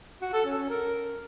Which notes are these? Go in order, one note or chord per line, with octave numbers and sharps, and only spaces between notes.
F#4
A4
C#4
C#4
A#4